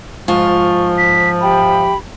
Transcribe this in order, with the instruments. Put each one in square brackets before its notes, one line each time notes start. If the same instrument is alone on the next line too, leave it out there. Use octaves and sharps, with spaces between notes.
[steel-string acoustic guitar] G#2 F4 [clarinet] F3 [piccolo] C#6
[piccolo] B6
[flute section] G4 E5 G5 [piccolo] B5